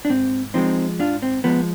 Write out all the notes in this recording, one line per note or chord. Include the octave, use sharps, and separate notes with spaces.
D4
G#2 C4
F3 G#3 C4 D#4
G#2 D4 F4
C4
F3 G#3 B3